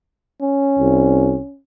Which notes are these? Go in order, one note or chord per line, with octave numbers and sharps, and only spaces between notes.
C#4
C2